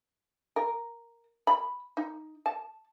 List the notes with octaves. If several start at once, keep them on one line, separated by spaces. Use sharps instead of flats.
A#4
B5
D#4
A5